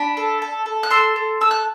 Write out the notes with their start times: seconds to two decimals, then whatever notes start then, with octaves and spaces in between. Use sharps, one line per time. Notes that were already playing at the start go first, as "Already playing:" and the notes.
Already playing: D4 B5
0.17 A4
0.42 A4
0.66 A4
0.83 F#6
0.90 A4 C6 E6
1.16 A4
1.41 A4 E6
1.51 F#6